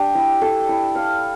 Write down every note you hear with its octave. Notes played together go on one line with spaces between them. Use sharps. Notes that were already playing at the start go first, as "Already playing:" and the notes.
Already playing: D4 G4
E4
A4
E4
F5